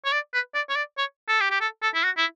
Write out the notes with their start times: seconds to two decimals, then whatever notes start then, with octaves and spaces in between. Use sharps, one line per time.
0.05 C#5
0.12 D5
0.34 B4
0.55 D5
0.69 C#5
0.76 D5
0.98 C#5
1.28 A4
1.40 G4
1.51 G4
1.61 A4
1.83 A4
1.94 E4
2.04 F#4
2.17 E4